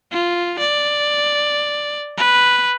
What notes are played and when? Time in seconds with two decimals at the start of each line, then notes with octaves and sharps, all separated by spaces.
0.12 F4
0.59 D5
2.17 B4